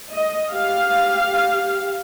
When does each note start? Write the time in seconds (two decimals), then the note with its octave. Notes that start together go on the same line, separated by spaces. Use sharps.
0.13 D#5
0.53 G4 F5